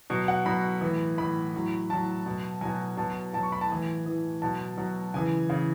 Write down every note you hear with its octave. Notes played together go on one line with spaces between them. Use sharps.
B2 F#3
F#5
B2 F#3 B5
A2 E3
A2 E3 B5
A2 F#3
A2 F#3 A5
B2 F#3
B2 F#3 G#5
B2 F#3 A5
B2 F#3 A5
C#6
B5
A5
A2 E3 G#5
A2 E3
B2 F#3 A5
B2 F#3
C#3 E3 G#5
C#3 E3